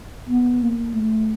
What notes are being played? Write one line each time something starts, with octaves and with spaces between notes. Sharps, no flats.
B3
A#3
A3